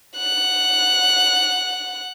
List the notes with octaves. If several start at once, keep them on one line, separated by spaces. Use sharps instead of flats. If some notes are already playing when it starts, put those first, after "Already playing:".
F#5 F#6